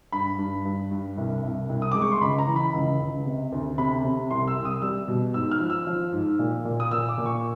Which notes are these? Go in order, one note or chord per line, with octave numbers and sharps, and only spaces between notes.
G2 B5
G2
G2
G2
C2
C2
C2
D#6
G#3 D6
C#6
C6
C#2 B5
A#5
E3
B5
C#2
C#2
C3
D2
C3 B5
C3
C2 C6
E6
C2
D#6
G3 E6
B2
G#2 E6
F6
F3
E6
F3
G#2
A#2
A#2
D#6
A#2 E6
D6
A#2
C#6